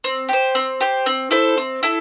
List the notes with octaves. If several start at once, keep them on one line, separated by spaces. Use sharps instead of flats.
C4
G4 C5
C4
G4 C5
C4
E4 A4 C5
C4
E4 A4